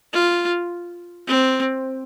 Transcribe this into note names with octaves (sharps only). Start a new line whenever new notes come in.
F4
C4